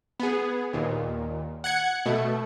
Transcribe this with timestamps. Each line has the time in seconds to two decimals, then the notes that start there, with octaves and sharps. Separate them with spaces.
0.20 B3 G#4
0.73 D#2 A#2
1.64 F#5 F#6 G#6 C#7
2.06 B2 A3